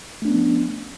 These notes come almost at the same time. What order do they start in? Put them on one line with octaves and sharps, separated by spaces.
A3 D4 B3 C#4 F3